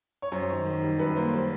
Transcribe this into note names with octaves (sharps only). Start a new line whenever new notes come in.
C#5
F#2 C5
D#3
D#3
G3
F#2 B4
A#3 C5
G3 C5